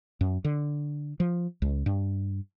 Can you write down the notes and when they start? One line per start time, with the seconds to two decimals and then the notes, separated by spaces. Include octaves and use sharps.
0.21 F#2
0.44 D3
1.20 F3
1.62 C#2
1.86 G2